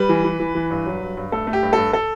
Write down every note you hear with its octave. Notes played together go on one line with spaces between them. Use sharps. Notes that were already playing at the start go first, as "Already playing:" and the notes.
Already playing: G3 B4
E3
E3
E3
E3
G2
F#3
G2
G2
A3 A4
A3
G4
G2
G2 A4
A4